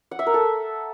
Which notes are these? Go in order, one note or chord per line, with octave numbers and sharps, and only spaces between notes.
F#5
E5
A#4
A4